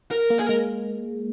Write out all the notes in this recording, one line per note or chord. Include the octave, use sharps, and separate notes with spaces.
A#4
A#3
G#4
G#3 A#4